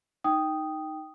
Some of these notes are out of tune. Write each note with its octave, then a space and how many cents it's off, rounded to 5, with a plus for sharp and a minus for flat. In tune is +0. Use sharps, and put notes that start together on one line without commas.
D#4 +0 G5 +0 D#6 +0